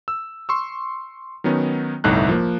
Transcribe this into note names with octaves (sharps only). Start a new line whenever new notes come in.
E6
C6 C#6 E6
D#3 F#3 B3 C#4 D#4
G1 C2 A2 D#4 A5 F#6
F3 A#3